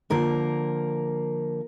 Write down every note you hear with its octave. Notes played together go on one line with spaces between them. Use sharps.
D3 F3 A#3 A#4